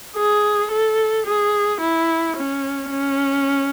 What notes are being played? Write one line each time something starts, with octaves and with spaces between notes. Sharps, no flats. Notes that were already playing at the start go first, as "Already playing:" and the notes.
G#4
A4
G#4
E4
C#4
C#4